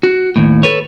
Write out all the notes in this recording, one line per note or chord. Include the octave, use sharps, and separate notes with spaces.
F#4
D#2 A2
A4 B4 C#5